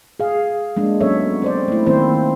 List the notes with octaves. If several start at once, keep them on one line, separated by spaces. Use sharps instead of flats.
G#4 F5
G#3 A#3 D4
F#3 B3 C#4 A4 C#5 E5
C4 C5 D5
A3 E4
D#3 A#3 C4 E4 C5